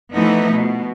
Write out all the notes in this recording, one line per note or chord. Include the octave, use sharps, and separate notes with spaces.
E3 F3 A3 B3 D#4 E4
B2